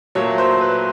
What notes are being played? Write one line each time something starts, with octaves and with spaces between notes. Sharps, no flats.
A#2 F#3 A3 C#5
C5
B4